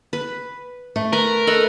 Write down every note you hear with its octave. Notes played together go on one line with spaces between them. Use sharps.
B4
A3
A#4 B4
A4 B4 D#5 B5